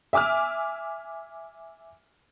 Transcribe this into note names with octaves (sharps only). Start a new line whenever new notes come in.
E5 G#5 D6 E6 F6